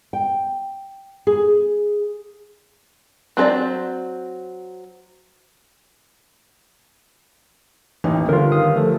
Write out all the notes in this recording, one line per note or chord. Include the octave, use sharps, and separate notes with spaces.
G5
G#4
F#3 C4 A4 C5 D5
A1 D#2 E3 D#4
G1 D3 F4 A#4
D#3 F5 D#6
F3 A3 A4